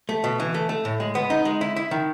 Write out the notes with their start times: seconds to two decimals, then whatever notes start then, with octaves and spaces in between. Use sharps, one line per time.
0.09 A3
0.24 B2
0.40 E3
0.54 A3
0.69 A3
0.85 A2
1.00 G#3
1.15 B3
1.30 D#4
1.45 G#3
1.61 E4
1.76 E4
1.91 D#3